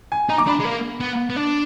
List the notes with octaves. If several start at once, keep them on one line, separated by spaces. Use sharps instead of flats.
G#5
D#4 A#5
D6
D4 B5
G#3
A#3
B3
B3
D4